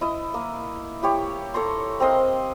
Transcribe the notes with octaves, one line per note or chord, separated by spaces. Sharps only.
E4 D#5
A#3
E4 G4 C#5
A4 C#5 A#5 C6
C4 A#4 D#5 F5